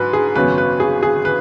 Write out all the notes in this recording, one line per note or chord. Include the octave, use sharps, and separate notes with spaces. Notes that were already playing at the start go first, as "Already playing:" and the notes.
Already playing: G#2 F#3 B4
G#4
G#1 F#2 C#3 F#3 B3 B4
B4
G#4
G#4
B4